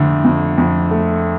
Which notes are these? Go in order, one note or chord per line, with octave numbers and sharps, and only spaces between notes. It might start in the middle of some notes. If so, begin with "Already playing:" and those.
Already playing: F2 D3 A3
F2
F2
A3